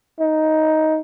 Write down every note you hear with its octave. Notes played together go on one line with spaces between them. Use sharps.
D#4